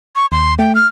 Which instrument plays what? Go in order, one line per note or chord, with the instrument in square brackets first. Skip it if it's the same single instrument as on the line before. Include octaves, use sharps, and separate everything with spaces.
[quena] C#6
[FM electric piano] D#2 [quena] C6
[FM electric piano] A3 [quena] G5
[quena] F6